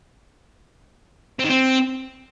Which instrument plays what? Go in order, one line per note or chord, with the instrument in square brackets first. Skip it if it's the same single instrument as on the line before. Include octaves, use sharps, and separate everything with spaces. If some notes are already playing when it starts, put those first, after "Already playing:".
[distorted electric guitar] C4
D#3
C4